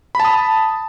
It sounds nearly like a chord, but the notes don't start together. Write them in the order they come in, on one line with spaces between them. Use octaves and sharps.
B5 A5 D#6